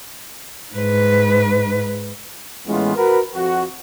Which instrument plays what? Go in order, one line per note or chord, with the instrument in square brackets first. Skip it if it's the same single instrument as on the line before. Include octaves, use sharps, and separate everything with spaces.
[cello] G#2 B4
[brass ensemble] A2 E3 G#3 B3 C#4 F4
F#4 A#4 B4
F2 F#4